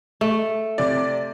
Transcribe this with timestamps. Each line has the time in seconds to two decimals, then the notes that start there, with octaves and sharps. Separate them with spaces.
0.21 A3
0.78 C3 D5